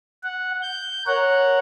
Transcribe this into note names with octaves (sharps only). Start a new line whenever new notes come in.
F#5
G6
A#4 C#5 F#5